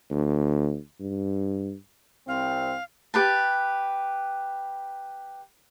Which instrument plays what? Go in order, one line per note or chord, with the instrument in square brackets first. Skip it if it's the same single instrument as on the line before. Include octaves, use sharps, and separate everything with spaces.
[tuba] D2
G2
[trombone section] C2 C4 [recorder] F5
[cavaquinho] G4 B4 A5